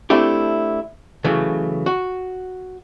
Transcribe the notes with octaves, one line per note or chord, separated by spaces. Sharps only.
A3 C4 D4 E4 G4
C#3 E3 F#3 A3
F#4